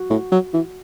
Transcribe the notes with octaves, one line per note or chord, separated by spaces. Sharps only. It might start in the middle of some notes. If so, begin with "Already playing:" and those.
Already playing: F#4
A2
F#3
E3